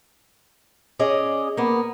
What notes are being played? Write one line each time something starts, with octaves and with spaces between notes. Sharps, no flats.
C#4 G#4 D5 D#5
A#3 B3